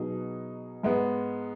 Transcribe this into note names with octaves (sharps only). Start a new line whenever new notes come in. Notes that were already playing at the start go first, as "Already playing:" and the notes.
Already playing: B2 F#3 D#4 G#4
G#2 G#3 B3